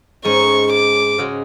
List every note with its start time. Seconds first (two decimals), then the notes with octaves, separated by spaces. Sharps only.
0.25 G#2 G#3 C#4 C#6
0.72 D6
1.18 C#3 G#3 C#4 F#4